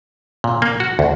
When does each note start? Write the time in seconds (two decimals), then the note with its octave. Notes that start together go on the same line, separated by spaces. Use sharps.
0.44 A#2
0.62 A#3
0.80 F#4
0.99 D2